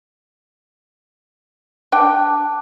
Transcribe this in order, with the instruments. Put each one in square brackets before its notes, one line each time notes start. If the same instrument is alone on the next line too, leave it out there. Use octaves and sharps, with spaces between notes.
[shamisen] D4 G5 [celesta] A5 D6 F#6